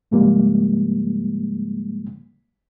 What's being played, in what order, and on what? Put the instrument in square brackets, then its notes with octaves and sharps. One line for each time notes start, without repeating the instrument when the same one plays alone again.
[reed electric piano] G#2 C#3 F3 G3 G#3 A#3